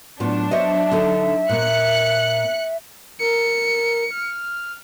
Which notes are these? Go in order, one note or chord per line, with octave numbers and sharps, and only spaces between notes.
A2 F#3 B3 D4 F4
C5 C#5 D#5 E5
D3 D#4 A4
A#2 A#3 F#6 C#7
A#4 C#7
F6